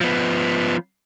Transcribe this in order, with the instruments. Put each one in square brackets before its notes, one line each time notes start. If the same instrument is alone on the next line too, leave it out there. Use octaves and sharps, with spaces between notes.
[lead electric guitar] F3 B3